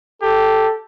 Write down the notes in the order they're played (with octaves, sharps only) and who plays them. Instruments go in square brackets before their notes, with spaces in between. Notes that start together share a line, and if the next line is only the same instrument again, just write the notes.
[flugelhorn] G4 [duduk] A4